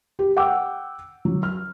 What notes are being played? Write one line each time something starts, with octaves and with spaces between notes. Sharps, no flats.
G4
F#5 G5 D6 E6
F#3
F6